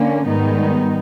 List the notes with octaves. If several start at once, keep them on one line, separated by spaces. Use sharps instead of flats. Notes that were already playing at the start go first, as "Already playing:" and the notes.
Already playing: D3 A#3 C#4
G#2 D#3 G3 B3 D#4